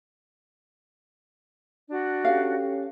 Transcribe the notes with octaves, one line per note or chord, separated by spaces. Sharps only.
D4 F#4
C#4 G4 A4 F5